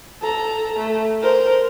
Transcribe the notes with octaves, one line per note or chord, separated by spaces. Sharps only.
A4 A#5
A3
A#4 C5